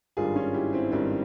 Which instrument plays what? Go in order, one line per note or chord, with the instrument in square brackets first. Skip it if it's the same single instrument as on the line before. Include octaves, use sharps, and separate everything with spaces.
[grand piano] G#1 G2 G3 F4 G#4
C#4 F4
E4 G4
C4 E4
G#1 G2 G3 C4